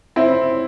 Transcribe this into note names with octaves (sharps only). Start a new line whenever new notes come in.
C4 E4